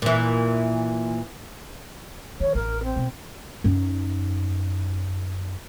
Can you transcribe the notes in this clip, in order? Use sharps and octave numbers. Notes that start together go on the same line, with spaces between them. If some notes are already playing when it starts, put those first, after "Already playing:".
A#2 E3
D#3 C#5
A1 A#4
C4
B2
F#2 D#4